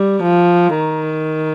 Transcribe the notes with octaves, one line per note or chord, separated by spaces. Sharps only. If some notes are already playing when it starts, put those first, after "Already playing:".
Already playing: G3
F3
D#3